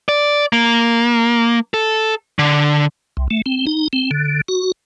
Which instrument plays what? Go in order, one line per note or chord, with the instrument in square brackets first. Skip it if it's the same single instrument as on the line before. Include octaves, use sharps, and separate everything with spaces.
[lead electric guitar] D5
A#3
A4
D3
[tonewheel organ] C2
A3
C4
D#4
C4
D3
F#4